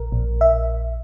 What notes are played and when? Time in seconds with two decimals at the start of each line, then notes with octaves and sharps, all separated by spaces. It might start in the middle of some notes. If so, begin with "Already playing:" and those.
Already playing: A#1 A#4
0.12 A#1
0.41 E5